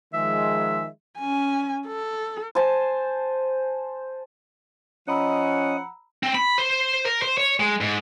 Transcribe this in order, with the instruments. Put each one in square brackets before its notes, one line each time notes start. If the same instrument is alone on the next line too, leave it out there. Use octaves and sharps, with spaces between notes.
[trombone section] D#3 F3 G#3 [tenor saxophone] E5
[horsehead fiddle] C#4 G#5
A4
[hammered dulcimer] C5 G#5 A5
[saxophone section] F3 F#5 [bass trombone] C#4 [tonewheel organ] D#5 [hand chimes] A#5 B5 E6
[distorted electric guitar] C4
B5
C5
A#4
C5
C#5
G#3
G#2